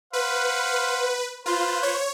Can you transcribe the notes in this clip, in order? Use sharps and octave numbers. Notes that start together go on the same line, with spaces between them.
B4 C5 F5 F#5
F4 B4 C5
C#5